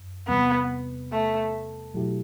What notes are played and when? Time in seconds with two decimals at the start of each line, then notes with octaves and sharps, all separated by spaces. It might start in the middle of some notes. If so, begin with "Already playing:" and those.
Already playing: F#2
0.28 E2 C3 G3 B3
1.12 A3
1.94 B2 F#3 A3 E4 G4